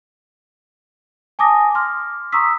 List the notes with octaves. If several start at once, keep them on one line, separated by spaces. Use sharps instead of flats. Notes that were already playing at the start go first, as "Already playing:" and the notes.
G#5 A5 D6 D#6 A#6
C6 D6 F6
A#5 C6 C#6 D#6 E6 B6